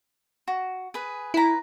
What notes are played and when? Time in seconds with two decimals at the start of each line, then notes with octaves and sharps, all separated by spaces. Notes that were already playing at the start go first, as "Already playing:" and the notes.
0.48 F#4
0.94 G#4 B4
1.34 E4 B4 A#5